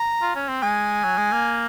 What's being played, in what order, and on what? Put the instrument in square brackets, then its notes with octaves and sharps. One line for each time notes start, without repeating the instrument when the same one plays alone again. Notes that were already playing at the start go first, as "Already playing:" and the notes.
Already playing: [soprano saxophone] A#5
[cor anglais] F4
C#4
C4
[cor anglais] G#3 [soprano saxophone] G#5
[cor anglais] F#3
G#3
A#3